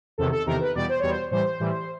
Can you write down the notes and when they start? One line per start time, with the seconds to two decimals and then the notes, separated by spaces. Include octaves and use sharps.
0.18 E2 C3 D#3 A4
0.33 A4
0.46 E2 C3 D#3 A#4
0.61 B4
0.75 E2 B2 G3 D5
0.89 C5
1.00 E2 B2 G3 C#5
1.09 C5
1.31 A2 E3 G3 C5
1.60 A2 E3 G3